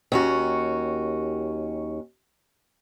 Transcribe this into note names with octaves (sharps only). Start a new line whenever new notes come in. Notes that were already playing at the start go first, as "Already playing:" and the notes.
D#2 C#4 F#4